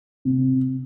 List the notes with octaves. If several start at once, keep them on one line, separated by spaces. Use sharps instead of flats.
C3